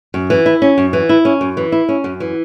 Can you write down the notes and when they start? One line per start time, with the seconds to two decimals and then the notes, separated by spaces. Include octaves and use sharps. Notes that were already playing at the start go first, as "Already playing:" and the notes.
0.14 F#2
0.30 E3
0.46 E4
0.62 C#4
0.78 F#2
0.93 E3
1.09 E4
1.25 C#4
1.41 F#2
1.57 E3
1.72 E4
1.89 C#4
2.04 F#2
2.20 E3